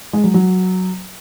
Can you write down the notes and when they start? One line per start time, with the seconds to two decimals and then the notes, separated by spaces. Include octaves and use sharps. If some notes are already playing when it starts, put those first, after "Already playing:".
0.13 G#3
0.24 F#3
0.34 F#3